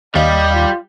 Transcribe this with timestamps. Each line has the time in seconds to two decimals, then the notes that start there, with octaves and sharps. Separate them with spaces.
0.15 D#2 G3 D#5 F5
0.55 F4